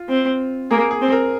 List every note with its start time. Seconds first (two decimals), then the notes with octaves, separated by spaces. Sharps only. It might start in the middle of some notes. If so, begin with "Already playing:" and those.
Already playing: F4
0.09 C4
0.71 A#3 G#4
0.91 G#4
1.01 C4
1.12 A#4